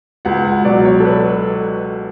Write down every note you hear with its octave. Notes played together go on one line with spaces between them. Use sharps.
C#2 F#5
F#5
B2 F#3 D5
C#5
A4
B4